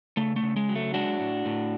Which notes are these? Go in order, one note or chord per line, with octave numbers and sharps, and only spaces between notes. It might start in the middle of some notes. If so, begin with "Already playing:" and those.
C#3 A3
A3
C#3
G#3
F#3
A3
G#3 D4 F#4
A2
A2